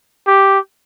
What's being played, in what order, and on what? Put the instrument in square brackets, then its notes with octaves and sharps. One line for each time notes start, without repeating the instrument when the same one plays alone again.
[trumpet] G4